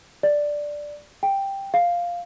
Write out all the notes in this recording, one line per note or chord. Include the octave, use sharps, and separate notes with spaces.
D5
G5
F5